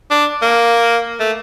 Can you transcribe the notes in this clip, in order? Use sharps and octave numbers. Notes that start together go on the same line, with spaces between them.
D4
A#3
A3